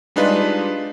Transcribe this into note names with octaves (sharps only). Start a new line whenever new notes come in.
G3 G#3 D4 D#4 F4 B4